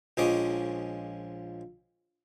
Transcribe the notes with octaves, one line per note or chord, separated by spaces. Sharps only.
A#1 F3 G#3 C#4 D#5 D6